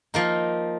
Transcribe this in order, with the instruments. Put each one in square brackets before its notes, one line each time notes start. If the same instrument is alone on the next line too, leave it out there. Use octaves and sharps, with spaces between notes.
[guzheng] F3 A#3 D#4